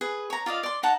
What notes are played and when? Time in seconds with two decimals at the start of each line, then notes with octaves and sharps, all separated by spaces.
0.01 G#4 B4
0.30 C#5 A#5
0.46 F4 D5 D#5 F5
0.63 D5 C6
0.83 D#4 F#5 A5 A#5